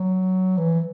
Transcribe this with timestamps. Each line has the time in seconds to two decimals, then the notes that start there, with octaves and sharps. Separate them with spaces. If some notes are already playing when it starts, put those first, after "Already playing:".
Already playing: F#3
0.58 E3